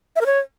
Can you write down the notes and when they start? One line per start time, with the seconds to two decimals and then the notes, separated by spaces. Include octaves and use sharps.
0.16 E5
0.21 A#4
0.26 C#5